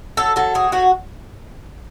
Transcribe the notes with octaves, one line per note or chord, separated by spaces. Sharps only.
F#3 A4
F#3 A4
A3 G#4
F#3 F#4